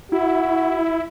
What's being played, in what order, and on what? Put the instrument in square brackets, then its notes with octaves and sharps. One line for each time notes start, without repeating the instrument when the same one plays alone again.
[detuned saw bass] E4 [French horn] F#4